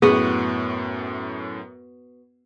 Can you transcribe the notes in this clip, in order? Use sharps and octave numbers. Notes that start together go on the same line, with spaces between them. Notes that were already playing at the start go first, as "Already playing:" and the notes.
F#2 A2 B3 F#4 G#4